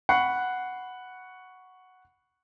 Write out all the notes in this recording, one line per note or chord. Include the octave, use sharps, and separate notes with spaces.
F#5 B5 C#6 F#6 C7